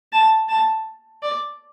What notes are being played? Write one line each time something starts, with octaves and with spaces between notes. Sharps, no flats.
A5
A5
D5